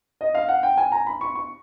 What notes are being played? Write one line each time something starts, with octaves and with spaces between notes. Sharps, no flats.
D#5
F5
F#5
G5
G#5
A#5
B5
C#6
C#6